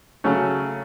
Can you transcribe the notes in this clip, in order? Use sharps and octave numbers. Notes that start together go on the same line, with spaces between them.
C#3 F#3 A3 C#4